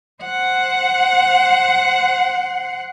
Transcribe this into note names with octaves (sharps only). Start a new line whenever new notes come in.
C5 F#5